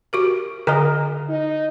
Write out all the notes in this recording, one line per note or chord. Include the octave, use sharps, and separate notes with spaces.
F#4 G4 A#4
D3 A#4 D#5
D#4